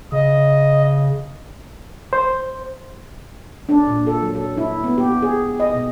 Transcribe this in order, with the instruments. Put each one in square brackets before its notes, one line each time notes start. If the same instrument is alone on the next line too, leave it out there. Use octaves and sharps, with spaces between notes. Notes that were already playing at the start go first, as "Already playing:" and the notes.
[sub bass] C#3 [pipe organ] D#5
[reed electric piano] C5
[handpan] D4
A#2
A4
F#3
A4
E4
B3
G4
G#4
D#5
B2